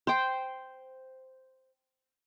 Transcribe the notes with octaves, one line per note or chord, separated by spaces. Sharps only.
C5 G5